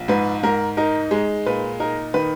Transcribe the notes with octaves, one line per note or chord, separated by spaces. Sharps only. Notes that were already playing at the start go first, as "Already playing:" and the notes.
Already playing: A#1
G#2 B4
G#2 A#4
D#4 A#4
G#3
A#2 B4
D#4 A#4
D#3 B4